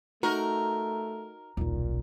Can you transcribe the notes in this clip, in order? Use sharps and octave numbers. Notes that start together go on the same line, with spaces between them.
A3 D#4 F#4 A#4
D#1 B1 A#2